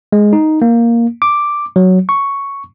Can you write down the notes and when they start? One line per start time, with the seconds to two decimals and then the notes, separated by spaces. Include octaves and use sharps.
0.12 G#3
0.33 D#4
0.62 A#3
1.22 D6
1.76 F#3
2.09 C#6